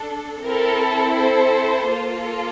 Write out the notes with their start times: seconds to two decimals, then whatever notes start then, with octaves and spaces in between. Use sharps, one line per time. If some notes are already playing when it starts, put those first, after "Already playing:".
Already playing: D4 A4
0.45 C4 E4 A4 A#4
1.16 A4 C5
1.89 A#3 F4 A4